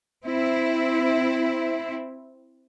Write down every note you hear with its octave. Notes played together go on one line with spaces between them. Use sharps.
C4 E4